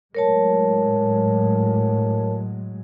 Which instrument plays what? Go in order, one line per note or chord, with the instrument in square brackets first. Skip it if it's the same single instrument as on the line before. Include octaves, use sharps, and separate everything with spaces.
[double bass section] A2 F#3 G#3 [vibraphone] A#4 C#5 A5